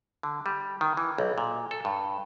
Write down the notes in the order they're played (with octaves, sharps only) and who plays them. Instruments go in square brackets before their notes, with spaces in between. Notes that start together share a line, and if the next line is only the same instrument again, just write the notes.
[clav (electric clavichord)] D3
G3
D#3
E3
B1
A#2
A4
G2